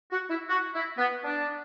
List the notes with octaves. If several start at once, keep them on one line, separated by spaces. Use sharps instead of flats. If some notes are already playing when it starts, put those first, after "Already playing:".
F#4
E4
F#4
E4
B3
D4